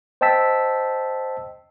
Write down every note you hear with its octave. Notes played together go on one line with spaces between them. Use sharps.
C5 D#5 G5 A5 E6 B6